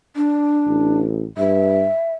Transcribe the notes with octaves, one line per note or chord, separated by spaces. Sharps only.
D4
A1
G2 E5